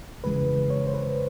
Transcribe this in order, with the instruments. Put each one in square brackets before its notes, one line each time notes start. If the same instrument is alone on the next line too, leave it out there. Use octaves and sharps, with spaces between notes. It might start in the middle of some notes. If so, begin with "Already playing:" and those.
[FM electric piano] G1 F2 C#3 E3 G#3 B4
C#5
C5
B4